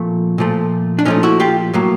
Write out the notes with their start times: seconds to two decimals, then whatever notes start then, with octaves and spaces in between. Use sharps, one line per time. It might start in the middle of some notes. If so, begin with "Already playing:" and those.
Already playing: A#2 F3 A3 C4
0.38 A#2 F3 A3
0.99 D4
1.05 A#2 F3 A3 C#4 D#4
1.23 E4 F#4
1.40 F4 G4
1.74 A2 F#3 A#3